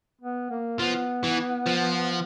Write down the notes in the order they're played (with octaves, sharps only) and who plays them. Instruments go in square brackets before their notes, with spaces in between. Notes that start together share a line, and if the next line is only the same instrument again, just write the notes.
[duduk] B3
A#3
[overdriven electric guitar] F3 [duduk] B3
[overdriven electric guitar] E3
F3